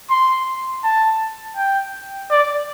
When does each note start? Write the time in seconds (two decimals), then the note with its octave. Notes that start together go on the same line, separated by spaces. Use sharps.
0.10 C6
0.83 A5
1.57 G5
2.31 D5